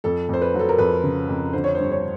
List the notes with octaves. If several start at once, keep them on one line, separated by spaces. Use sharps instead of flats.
F2 A4
F2 C5
B4
F#3
A4
A#4
F2 B4
C#3
F2
D3 C5
C#5
C5
G2
C#5